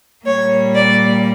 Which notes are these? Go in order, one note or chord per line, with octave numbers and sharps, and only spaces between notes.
A#2 G3 A#3 C#5
D5